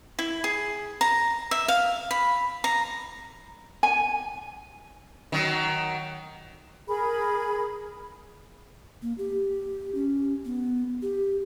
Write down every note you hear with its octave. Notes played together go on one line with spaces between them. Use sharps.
E4
G#4
A#5
E5
F5
B5
A#5
G#5
D#3 F#3
G#4 A#4 B5
A#3
G4
C#4
B3
G4